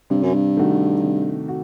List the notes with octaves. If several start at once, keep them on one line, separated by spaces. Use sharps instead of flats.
G2 C3
F#2
G2
D#3 A3 D#4 F#4
C3
F#4